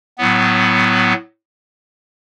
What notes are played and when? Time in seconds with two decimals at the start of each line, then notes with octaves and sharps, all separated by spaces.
0.18 A2 F#3 B3